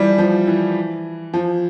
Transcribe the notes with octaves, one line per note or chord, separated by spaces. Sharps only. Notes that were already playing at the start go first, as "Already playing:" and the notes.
Already playing: E3 F3 G3
F3
E3
F3